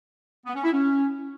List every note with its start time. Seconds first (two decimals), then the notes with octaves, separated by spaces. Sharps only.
0.46 B3
0.55 C#4
0.64 E4
0.73 C#4